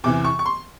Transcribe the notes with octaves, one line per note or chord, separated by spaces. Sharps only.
E2 C3 E3 D6
C#6
C#6
C6